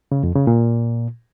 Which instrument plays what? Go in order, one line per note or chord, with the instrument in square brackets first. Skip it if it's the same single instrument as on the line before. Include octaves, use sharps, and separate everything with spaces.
[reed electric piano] C#3
F2
C#3
A#2